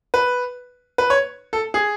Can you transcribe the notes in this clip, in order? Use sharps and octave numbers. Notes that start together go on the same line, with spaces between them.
B4
B4
C#5
A4
G#4